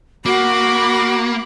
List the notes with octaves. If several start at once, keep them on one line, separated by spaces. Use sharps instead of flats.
A#3 F#4 B5 D6